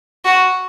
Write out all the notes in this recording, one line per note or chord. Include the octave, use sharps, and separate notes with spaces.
F#4